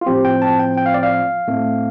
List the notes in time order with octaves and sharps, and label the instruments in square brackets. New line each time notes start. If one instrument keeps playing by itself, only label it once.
[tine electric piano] F4
A2 F3 C4 G4
G5
A5
G5
G5
F5
D5
F5
A2 A3 C4